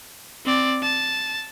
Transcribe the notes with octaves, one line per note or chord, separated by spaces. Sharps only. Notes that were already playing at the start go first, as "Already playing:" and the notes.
C4 D5
A5